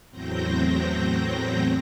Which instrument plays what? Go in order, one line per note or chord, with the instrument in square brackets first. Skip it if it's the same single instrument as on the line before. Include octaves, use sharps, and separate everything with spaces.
[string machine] E2 A2 F#3 C4 G6 A#6